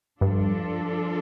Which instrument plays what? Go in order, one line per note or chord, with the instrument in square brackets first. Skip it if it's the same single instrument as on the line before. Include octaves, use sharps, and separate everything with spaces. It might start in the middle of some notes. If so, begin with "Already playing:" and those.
[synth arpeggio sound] G2 [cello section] F3 D4 F4 A4